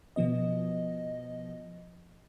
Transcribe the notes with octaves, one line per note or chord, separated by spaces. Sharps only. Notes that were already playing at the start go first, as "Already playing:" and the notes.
B2 F3 B3 D#5